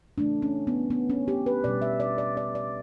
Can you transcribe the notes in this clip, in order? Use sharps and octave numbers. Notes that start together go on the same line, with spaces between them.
C#3 E3 A3 D4
C#4
B3
B3
C#4
G4
B4
B2 G3 D5
E5
D5
D5
D5
D5